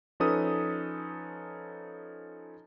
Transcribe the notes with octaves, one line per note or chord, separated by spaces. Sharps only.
F3 C#4 D#4 A4 B4 D#6